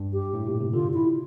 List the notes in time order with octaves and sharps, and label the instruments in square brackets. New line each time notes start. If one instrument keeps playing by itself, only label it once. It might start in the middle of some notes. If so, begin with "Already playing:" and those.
Already playing: [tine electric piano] G2
[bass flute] G4
[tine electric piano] A2
A#2
C3
[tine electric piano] D3 [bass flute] F4
[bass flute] E4